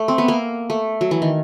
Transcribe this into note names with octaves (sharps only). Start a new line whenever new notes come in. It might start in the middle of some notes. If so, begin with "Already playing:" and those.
Already playing: A3
C4
B3
A#3
A3
F#3
E3
D#3